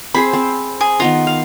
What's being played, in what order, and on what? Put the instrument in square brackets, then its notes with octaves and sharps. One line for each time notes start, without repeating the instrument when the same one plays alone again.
[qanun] C4 G#4 C5 [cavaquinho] B5
[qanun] C4
[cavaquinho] G#4
[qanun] D#3 B3 A#5 [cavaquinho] F4
[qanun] F5